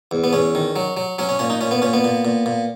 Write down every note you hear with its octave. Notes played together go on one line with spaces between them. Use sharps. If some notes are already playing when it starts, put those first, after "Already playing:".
E2
B3
E2 C#4
D#3
F#3
F#3
F#3 C#4
C#4
A#2 C#4
D#4
A#2 C#4
B3
A#2 C#4
B3
A#2
A#2
A#2